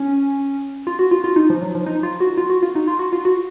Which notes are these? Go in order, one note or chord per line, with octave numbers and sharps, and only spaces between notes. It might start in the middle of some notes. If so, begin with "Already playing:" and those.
Already playing: C#4
F4
F#4
F4
F4
D#4
F3
F#3
F3
D#4
F4
F#4
F4
F#4
F4
D#4
F4
F#4
F4
F#4